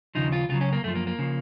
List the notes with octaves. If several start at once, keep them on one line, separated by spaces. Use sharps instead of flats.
D#2 C#3 F3 D#4
F4
C#2 C#3 F#3 F4
C#4
A#3
F#2 F3 A3
A#3
A#3
C#3 F3